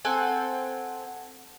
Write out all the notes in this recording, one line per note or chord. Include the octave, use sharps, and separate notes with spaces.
C4 A4 F#5 G#5